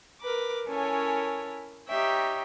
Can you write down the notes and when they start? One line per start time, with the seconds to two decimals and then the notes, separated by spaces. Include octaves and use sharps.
0.23 A#4 B4 D6
0.69 C#4 E4 A4 A#4 C#5 G#5
1.89 D#4 G4 C#5 E5 G5